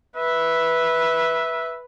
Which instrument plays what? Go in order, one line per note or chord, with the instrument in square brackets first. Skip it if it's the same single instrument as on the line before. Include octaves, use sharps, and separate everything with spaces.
[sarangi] B4 [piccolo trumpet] E5